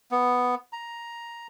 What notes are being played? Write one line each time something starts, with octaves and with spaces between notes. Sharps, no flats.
B3
A#5